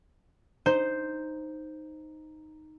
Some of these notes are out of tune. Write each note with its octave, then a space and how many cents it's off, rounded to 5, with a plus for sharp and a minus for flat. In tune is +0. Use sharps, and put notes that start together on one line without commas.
D#4 -5 C5 +0